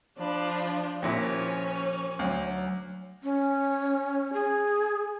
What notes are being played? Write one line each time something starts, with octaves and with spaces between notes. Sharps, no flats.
F3 D4 B5
D#2 A#2 F3 C#4 E4
D2 F#3
C#4
G#4